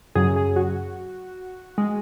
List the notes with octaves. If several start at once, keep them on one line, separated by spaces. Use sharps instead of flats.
F#2 C#3 F#3 G#4
G#4
F#4
G#3